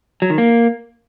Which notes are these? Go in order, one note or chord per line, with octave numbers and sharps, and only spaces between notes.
F#3
D#3
A#3